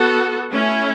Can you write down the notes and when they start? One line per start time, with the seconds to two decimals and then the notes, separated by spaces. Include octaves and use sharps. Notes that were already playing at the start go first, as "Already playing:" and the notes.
Already playing: B3 F#4 A4
0.50 A3 C#4 E4